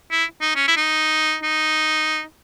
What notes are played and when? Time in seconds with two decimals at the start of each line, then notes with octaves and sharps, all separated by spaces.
0.11 E4
0.41 D#4
0.55 C#4
0.68 E4
0.77 D#4
1.43 D#4